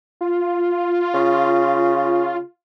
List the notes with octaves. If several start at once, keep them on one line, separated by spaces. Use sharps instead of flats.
F4
C#3